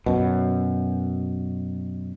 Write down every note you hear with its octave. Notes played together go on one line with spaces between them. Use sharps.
F#2 B2